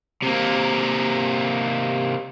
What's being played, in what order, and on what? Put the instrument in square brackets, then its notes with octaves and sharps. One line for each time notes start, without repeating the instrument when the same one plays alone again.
[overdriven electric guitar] C3 A#3